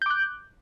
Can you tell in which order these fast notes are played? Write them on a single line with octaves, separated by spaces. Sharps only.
G6 D6 F#6